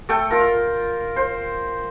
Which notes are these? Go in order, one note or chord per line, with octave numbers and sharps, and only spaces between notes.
A3 A4 G5
F4 A#4
C5